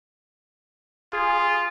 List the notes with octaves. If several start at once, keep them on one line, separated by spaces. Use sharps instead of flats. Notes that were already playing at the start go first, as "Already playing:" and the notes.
F4 G#4